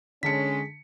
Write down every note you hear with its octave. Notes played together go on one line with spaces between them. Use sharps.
D3 G#3 C#4 A5 B6 C#7